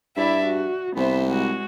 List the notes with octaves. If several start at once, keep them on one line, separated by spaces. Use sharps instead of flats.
G2 E4 D5 E5
F#4
C2 B3 C5 E5
G#3 F#4